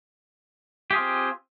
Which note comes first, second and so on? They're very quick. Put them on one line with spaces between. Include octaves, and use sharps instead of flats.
G4 G#4 F4 C4